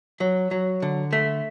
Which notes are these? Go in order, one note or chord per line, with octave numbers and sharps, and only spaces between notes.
F#3
F#3
D3
A3